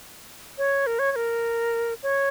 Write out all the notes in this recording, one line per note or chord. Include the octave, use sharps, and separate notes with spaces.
C#5
A#4
C#5
C#5
A#4
C#5